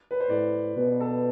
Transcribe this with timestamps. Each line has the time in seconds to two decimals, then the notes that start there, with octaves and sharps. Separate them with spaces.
0.11 B4
0.20 C5
0.29 A2 D5
0.76 B2 B4
1.00 A4